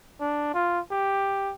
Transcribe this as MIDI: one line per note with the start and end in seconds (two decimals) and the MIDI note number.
0.21 0.50 62
0.54 0.80 65
0.91 1.53 67